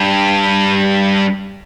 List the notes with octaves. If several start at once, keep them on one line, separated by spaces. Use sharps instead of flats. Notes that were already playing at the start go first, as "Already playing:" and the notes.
Already playing: G2